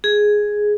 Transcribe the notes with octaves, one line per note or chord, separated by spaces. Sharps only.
G#4